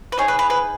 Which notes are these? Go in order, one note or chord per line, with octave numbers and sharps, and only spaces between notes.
B4
D#4 G#4 C#5
B4
B4
B4